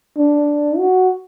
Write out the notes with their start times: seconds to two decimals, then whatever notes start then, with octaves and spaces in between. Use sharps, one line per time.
0.18 D4
0.78 F#4